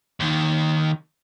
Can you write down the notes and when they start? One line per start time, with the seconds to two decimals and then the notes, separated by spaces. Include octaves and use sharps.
0.20 D#2 D#3